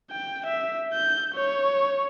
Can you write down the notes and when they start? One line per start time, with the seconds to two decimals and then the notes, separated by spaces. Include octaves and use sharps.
0.11 G5
0.46 E5
0.94 G6
1.35 C#5